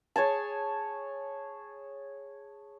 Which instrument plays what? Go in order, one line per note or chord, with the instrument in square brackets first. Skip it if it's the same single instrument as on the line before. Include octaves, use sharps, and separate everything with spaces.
[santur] G#4 C#5 G#5 A5